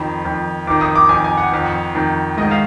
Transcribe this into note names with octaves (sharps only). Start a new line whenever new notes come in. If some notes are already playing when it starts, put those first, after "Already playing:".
Already playing: F2 D#3 B5
F2 D#3
F2 D#3 D6
D#6
D6
F2 D#3 G#5
G#5
F#5
F2 D#3
F2 D#3
G#2 D#3 D#5
F5